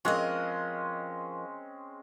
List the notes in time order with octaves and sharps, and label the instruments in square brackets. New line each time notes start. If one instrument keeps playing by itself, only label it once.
[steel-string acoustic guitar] F3 A#4 D#5 [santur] G#3 C4 C#4